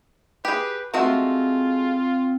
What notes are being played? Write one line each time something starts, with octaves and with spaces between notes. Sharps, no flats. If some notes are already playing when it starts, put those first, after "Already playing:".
G4 G#4 B4
G#3 A3 C4 F4 F#4